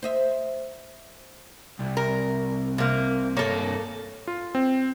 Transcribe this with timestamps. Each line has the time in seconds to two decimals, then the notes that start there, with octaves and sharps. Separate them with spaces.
0.03 C5 D#5 E5
1.80 C2
1.97 A#4
2.78 C3 A#3
3.37 G2 A#3 A4 C#5
4.27 F4
4.55 C4